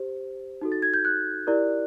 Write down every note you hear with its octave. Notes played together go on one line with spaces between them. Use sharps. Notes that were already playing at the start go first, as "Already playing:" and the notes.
Already playing: G4 C5
D#4 F#4 A4
A6
G#6
G6
F#6
E4 G4 A#4 D5